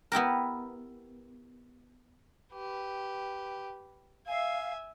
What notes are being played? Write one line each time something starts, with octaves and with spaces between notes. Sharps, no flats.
B3 E4 G4 A#4
G4 B4
E5 F5 G#5